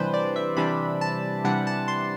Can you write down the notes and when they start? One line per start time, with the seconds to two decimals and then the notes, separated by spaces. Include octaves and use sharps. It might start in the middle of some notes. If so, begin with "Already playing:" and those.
Already playing: C3 E3 G3 D4 B4 C5
0.14 D5
0.36 E5
0.57 C3 E3 G3 D4 B5
1.01 A5
1.44 C3 E3 G3 D4 F#5
1.67 A5
1.88 C6